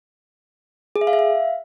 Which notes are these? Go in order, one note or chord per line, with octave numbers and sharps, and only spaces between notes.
G#4
E5
F5
E5
F5